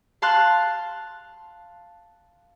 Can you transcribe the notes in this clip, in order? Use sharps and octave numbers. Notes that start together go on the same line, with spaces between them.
F5 A5 C6 F6 F#6